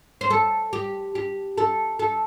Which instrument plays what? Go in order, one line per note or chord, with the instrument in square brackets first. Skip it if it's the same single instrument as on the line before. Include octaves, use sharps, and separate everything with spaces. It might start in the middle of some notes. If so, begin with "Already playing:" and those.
[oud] C5
A4
G4
G4
A4
A4